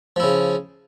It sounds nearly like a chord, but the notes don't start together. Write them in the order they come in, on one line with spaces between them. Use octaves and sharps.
F3 E4 C#3